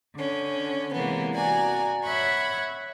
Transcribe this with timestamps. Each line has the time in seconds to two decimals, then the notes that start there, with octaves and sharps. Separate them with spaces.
0.14 D3 C#4
0.95 C3 E3 G#3 A#3 B3
1.34 F#4 D5 G#5 A#5
2.04 C#5 E5 F#5 B5 C#6